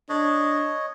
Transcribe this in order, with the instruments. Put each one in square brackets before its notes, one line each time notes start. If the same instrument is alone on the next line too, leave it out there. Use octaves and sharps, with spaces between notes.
[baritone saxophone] D4 [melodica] C#5 D#5